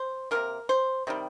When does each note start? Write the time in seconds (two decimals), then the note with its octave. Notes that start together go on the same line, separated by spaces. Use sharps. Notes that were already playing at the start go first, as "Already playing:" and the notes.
Already playing: C5
0.31 C3 F3 A#3 A#4
0.69 C5
1.07 C3 D#3 G3